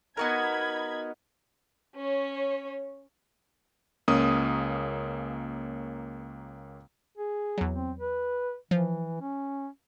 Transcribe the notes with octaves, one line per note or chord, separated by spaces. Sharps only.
B3 D#4 F#4 A#4 B5 G#6
C#4 C#5
C#2 A#3 C#4 D#6
G#4
E2 F#3
C4
B4
E3 F3
C#4